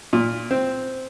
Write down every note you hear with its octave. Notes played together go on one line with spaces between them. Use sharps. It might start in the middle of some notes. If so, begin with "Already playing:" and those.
A#2
C4